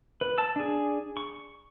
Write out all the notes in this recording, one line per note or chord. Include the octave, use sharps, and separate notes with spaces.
B4
A5 E6
D4 G#4
C#6